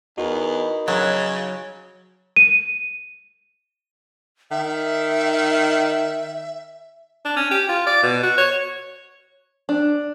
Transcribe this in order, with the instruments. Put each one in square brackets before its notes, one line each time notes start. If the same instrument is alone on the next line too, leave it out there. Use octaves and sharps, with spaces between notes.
[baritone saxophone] E2 [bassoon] D#4 [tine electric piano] F#4 A#4 B4
[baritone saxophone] C#3 [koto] F#3
[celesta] D#7
[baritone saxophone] D#3 [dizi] E5
[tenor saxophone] D4
C#4
G4
F4
D5
B2
F#4
C#5
[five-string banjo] D4